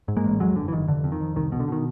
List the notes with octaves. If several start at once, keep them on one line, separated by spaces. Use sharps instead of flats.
G#2
G#3 A#3
A1
F2 F#3 G#3
G1 D3
E3
G1 D#3
F1 D3
F2
D#3
F2
C2 D#3
B2
D3
B2 D#3